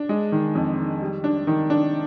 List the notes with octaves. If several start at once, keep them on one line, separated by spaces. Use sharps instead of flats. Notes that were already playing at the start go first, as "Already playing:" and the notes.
Already playing: D4
G#3
D#3
F2
D#3
G3
D4
D#3
D4